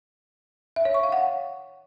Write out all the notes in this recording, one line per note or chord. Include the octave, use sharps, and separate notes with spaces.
E5
C#5
C#6
F5
F#5